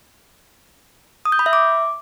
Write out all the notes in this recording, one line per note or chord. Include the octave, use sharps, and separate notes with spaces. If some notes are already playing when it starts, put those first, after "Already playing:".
D#6
G6
B5
E5
D6